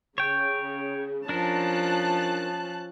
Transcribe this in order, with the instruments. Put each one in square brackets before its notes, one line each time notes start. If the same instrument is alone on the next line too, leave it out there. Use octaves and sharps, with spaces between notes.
[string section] C#3 [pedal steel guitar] C#5 G5
[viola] F3 C#4 [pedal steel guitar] D4 A#4 [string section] A5 F#6